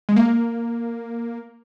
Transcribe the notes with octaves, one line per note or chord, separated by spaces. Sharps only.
G#3
A#3